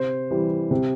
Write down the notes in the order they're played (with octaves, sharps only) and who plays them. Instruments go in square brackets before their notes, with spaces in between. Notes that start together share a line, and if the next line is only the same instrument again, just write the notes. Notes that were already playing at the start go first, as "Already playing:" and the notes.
Already playing: [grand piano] C3 C5
E3 G3
C3